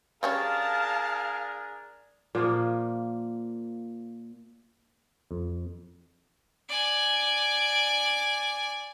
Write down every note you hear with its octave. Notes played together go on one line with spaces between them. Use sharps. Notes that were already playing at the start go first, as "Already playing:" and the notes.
C#3 G3 D4 G#4 A#4 C#5 F5 A5
A#2 F3 A#3
F2
D5 G#5